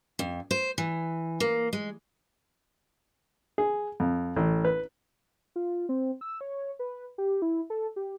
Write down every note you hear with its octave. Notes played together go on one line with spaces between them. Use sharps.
F2
C5
E3
A#3
G#3
G#4
F2
A1
B4
F4
C4
E6
C#5
B4
G4
E4
A4
G4